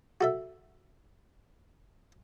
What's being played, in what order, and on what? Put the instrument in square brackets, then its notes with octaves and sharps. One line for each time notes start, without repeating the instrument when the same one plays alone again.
[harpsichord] F#4 A4 E5